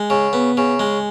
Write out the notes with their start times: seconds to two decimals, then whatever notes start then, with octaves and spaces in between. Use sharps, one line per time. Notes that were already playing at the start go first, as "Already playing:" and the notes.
Already playing: G#3
0.10 C#3
0.33 B3
0.57 C#3
0.80 G#3